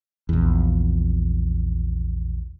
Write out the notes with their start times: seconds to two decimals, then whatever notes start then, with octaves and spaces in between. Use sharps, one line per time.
0.29 A#1 E2